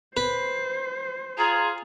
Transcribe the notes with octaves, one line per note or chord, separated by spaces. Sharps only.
B4 C5
F4 G#4 A#5